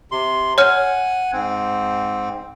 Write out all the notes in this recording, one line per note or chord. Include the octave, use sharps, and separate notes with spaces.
C3 C6
C#5 F#5 G#5 F6
G#2 C4